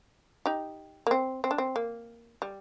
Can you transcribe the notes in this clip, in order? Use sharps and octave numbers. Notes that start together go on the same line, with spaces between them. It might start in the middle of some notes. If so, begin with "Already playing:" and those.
D#4 G4
A#3
C4
C4
D4
C4
A#3
G3